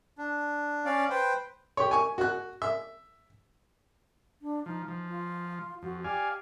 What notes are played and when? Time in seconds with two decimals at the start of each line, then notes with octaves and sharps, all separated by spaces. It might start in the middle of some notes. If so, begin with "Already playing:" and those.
0.18 D4
0.86 C#4 D5 F5
1.10 B4 C5 G5
1.77 G4 C#5
1.91 G#5 C#6
2.18 F#4 F#6
2.62 E5
4.42 D4
4.66 F3 D#4
4.88 F3
5.09 F4
5.82 F2 F#4
6.04 G4 D5 F5 G#5